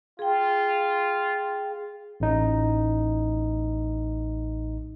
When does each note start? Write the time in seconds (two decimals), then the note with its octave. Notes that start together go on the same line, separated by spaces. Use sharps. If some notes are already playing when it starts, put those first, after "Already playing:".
0.19 F4 G#4 G5
2.20 A1 D#4